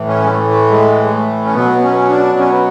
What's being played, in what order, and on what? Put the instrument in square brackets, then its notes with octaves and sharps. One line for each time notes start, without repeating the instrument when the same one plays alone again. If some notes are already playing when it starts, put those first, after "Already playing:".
Already playing: [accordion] A2 E3
C#4
G#3
A3
A3
G#3
G#3
A3
C#4
B2 F#3 B3
B3
C#4
D4
C#4
B3